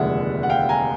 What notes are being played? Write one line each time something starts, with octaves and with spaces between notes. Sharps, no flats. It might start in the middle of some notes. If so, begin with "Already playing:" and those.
Already playing: F1 D#2 D3 F3 G#3 E5 F#5
F#5
F5 G5
G#5 A#5